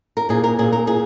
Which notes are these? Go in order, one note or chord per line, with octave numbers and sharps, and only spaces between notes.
A#4
A#2 G#4
A#4
A#2 G#4
A#4
A#2 G#4